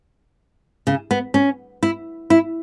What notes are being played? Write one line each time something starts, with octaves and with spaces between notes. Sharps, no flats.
C#3
B3
C#4
E4
E4